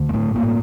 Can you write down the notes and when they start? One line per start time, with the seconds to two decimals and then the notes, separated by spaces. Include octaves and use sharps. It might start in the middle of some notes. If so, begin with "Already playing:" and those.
Already playing: D2 D3
0.09 A#3
0.14 A2 A3
0.35 A#3
0.43 A2